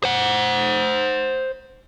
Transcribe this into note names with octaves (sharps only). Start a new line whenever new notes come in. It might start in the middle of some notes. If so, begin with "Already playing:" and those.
C5 F#5